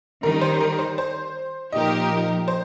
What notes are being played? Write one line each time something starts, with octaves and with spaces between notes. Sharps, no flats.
D#3 G3 D#4 A#4
C5
A#4
C5
C5
A#2 F3 D#4 G4 A#4 D#5
C5